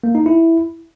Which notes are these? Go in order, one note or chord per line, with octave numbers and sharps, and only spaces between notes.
A#3
D#4
E4